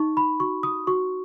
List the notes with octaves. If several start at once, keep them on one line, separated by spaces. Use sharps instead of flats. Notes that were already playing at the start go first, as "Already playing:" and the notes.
Already playing: D#4 C#6
B5
F#4 C#6
D#6
F#4 C#6